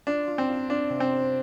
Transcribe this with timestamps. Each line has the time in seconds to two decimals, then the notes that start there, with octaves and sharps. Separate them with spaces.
0.07 D4 F4
0.27 F4
0.38 C4
0.49 F4
0.70 D4 F4
0.90 C3
1.00 C4
1.11 F4